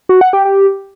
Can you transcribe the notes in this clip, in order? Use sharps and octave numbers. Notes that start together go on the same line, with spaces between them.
F#4
F#5
G4
G4